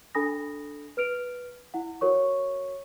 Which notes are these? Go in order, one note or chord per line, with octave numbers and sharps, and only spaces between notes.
D4 A4 G#5 B5 D#6 A#6
B4 F6 D7 F7
E4 F#5
F#4 A#4 C#5 C#6